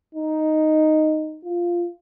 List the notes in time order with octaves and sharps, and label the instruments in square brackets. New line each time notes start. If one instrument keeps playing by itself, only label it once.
[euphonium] D#4
F4